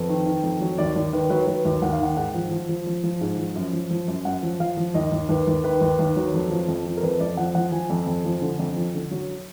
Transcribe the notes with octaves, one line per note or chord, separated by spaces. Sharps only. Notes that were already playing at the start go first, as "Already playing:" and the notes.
Already playing: F2 B4
D#3
D#3
F2
F#3
D#2 D5
D#2 D5
D#3 B4
F#3 B4
F#3 B4
D#2
D#2 F#5
F5
D#3 F#5
G#2 F#5
F3
F3
F3
F3
F3
G#2
F3
F#2
F3
F3
F#2
F#2 F#5
F3
F3 F5
F3
D#2 D#5
D#2
D#2 B4
D#2
D#3 B4
D#2
D#2
F#3
F2
F3
F2
F3
A#4
F2 B4
F2 D5
F3 F#5
F3 F#5
F3 G#5
F2
F2
F3
D3
F2
F3
D3
F#3